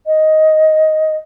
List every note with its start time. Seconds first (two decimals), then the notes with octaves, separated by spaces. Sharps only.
0.07 D#5